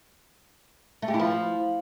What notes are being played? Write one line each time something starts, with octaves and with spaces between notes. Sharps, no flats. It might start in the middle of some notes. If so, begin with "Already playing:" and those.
A3
G4
E4
F3